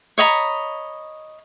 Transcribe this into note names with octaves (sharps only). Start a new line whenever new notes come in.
C#5 D#5 A#5 B5